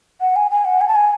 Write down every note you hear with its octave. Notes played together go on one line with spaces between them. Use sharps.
F#5
G#5
G#5
F#5
G#5
A5
G#5